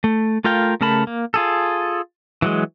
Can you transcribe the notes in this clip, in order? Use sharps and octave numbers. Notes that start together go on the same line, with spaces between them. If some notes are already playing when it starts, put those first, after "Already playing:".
A3
A3 F4 A#4 F5 G5
C#3 A3 A#4 A5 B5
A#3
F4 G#4 A4
E3 F#3 G#3